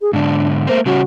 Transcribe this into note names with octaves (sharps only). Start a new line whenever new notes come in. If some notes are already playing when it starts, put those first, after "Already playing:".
G#4
G#2 D3 D4
A3 A#3 C4 C5
C#3 G3 C#4 F#4